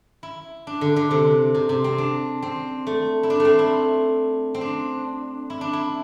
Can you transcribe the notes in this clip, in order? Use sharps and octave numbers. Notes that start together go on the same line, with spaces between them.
E4
D4
D3
D3
C3
C3
C3
C4
D4
C4
A3
E4
D4
A3 C4
E4
C4
D4
E4
D4
E4